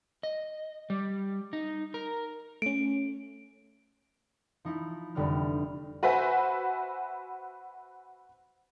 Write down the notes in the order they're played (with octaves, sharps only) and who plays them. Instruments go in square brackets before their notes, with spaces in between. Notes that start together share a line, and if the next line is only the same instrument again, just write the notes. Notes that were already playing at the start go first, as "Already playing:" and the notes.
[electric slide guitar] D#5
G3
D#4
A#4
[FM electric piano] A3 C#4 [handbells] D7
[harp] F3 D#4 E4
F1 D3 G3 B3 F6
[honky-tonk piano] F#4 B4 C5 E5 G#5 B5